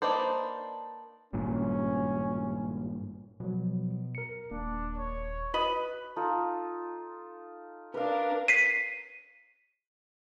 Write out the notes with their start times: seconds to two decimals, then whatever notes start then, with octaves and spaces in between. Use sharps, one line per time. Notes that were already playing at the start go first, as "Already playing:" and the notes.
0.02 A#3 D4 D#4 B4 C5
1.33 G#1 G2 A#2 C#4
3.40 B2 F3 F#3
4.15 A#4 C#7
4.51 D#1 A#3 D4
4.98 C#5
5.54 F#4 B4 D#5 B5
6.16 D#4 F4 A4
7.94 D4 A#4 B4 F5
8.48 B6 C7 D#7